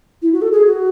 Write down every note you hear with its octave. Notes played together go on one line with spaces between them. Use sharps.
E4
F#4
A4
G#4
F#4